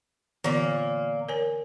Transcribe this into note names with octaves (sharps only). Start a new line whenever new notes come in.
A#2 D3 E3 A#3 B3
A#4 C#5 G#5